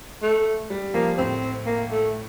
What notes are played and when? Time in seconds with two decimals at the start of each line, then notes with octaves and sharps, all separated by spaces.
0.22 A3
0.70 G3
0.94 F3 A#3
1.18 A2 C4
1.66 A#3
1.91 A3